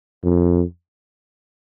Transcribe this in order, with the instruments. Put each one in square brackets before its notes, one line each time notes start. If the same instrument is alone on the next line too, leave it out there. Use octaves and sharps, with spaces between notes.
[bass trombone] F2